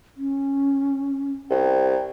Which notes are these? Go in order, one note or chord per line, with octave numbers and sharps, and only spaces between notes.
C#4
C2 G5